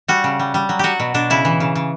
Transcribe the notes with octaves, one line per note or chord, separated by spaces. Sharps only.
G3 F#4
C#3
G3
G3
F#3
F#3 F#4 G4
B2
B2 D4
C#3 E4
E3
C#3
C#3